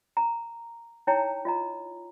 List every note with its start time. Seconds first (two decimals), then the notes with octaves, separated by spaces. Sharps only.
0.17 A#5
1.07 D#4 E4 C#5 G5 A#5
1.45 F4 D#5 A#5